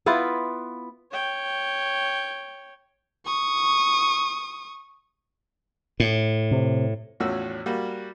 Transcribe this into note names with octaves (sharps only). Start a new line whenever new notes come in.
B3 E4 F4 B4
C#5 G5
C#6 D#6
A2
C3
E2 A2 F3 C#4 F#4 E6
G3 A#3 F#4